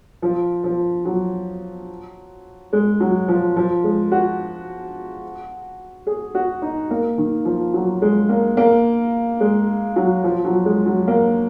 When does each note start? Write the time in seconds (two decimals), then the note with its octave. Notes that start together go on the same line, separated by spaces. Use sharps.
0.22 F3
0.64 F3
1.05 F#3
2.73 G#3
3.00 F#3
3.28 F3
3.56 F3
3.84 G#3
4.12 F#4
6.07 G#4
6.35 F#4
6.62 D#4
6.91 A#3
7.18 D#3
7.45 F3
7.74 F#3
8.02 G#3
8.29 A#3
8.57 A#3
9.40 G#3
9.96 F#3
10.24 F3
10.44 F#3
10.66 G#3
10.86 F#3
11.08 A#3